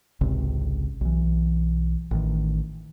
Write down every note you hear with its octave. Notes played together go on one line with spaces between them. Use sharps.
G#1 C#2 C3
B1 E3
A1 D#3